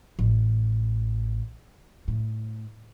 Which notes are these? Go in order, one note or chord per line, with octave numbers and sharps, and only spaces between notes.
A1
A2